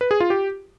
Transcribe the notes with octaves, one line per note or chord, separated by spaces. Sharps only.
B4
G#4
F4
G4